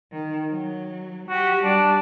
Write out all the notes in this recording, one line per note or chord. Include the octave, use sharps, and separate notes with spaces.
D#3
F#3
F#4 G4
G3 D4